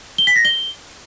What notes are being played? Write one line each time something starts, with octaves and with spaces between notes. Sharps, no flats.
G7
B6
A#6
G7